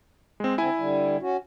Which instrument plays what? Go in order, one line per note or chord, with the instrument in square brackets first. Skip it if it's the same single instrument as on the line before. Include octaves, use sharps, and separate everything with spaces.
[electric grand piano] G#3 C4
[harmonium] D3 C4 [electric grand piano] E4 G#5
[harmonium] D3 G3
C#4 F#4